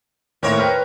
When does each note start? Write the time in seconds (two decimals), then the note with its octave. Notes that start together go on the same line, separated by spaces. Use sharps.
0.43 D#2 A2 C4 A#4 C#5 E5
0.59 B4 G5 F6